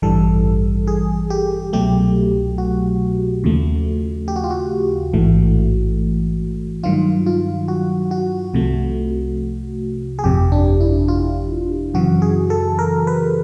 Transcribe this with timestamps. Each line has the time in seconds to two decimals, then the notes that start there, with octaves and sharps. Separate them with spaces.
0.02 A1 G2 E3 G3 A4
0.87 G#4
1.30 G4
1.73 C2 B2 F#3 A3 G4
2.58 F#4
3.44 D#2 C#3 F3 A3
4.28 G4
4.36 F#4
4.44 F4
4.51 F#4
5.13 A1 G#2 E3 A3
6.84 G2 D#3 F#3 F4
7.26 F4
7.68 F#4
8.11 F#4
8.54 C2 C3 F3 A3
10.19 G#4
10.24 G1 F2 C3 F3 G4
10.52 D4
10.80 E4
11.08 F4
11.94 F#2 C#3 E3 F#4
12.22 G#4
12.50 A4
12.79 A#4
13.07 B4